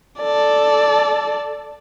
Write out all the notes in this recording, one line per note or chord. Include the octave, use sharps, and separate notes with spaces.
A4 D5